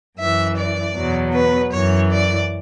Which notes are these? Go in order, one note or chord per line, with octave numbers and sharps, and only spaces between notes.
F#2 E3 E5
D5
E2 B2 F#3
B4
F#2 E3 C#5
D5